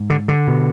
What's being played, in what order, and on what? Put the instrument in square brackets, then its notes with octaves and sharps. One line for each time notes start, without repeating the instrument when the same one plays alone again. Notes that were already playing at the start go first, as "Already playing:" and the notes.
Already playing: [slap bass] G#2
D3
D3
B2